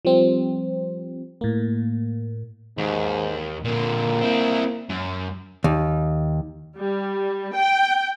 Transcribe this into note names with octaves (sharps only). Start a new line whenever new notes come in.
F3 G3 C4
A2 A#3
D#2 G#2
A#2 D3 A#3
C4 E4
F#2
D#2
G3
G5